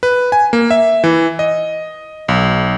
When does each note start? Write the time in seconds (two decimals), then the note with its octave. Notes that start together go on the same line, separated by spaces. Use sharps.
0.03 B4
0.32 G#5
0.53 A#3
0.71 E5
1.04 E3
1.39 D#5
2.28 B1